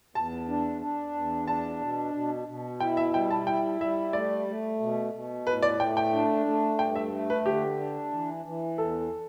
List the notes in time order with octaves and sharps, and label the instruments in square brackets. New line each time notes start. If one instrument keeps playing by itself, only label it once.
[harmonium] E2 [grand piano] A5
[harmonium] D4
D4
E2
[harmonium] D4 [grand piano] A5
[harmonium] B2
B2
B2
[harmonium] E4 [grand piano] G5
[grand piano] E5
[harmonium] G3 [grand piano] G5
[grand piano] A5
[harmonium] E4 [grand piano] G5
[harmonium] G3 [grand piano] E5
[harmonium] A3 [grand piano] D5
[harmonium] A3
B2
B2
[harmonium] A2 [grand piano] B4
[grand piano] D5
[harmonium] A3 [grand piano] G5
[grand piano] G5
[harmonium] D4
A3
[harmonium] G2 [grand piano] G5
[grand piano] E5
[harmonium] A3
[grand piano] B4
[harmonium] D3 [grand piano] G4
[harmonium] D4
E3
E3
[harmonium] E2 [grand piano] A4